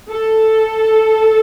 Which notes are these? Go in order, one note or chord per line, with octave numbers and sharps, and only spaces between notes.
A4